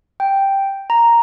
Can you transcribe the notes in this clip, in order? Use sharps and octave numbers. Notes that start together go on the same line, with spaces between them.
G5
A#5